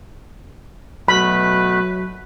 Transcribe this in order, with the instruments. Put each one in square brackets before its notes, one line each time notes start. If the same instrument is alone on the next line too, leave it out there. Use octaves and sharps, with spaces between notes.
[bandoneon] B2 A3 [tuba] F#3 [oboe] B4 [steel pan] B5